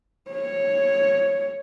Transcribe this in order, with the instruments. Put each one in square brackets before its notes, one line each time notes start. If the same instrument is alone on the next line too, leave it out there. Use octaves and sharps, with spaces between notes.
[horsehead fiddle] C#5